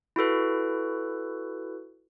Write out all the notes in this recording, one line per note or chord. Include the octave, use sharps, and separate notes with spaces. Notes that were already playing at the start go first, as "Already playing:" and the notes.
E4 F#4 A4 B4